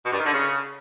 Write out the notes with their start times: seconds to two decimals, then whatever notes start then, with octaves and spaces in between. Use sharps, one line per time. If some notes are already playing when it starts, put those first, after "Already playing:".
0.04 B2
0.11 G2
0.18 D#3
0.26 D3
0.33 C#3